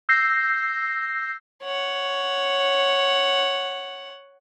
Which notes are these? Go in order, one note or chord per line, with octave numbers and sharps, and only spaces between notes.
E6 G6 A#6 C7
C#5 F#5